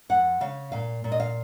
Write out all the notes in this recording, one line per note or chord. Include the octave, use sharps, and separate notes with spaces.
F2 F#5
C#3 F5
A#2 F5
A#2
D#5
F5